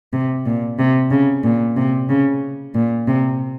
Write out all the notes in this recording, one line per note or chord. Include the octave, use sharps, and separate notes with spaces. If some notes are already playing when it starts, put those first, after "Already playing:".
C3
A#2
C3
C#3
A#2
C3
C#3
A#2
C3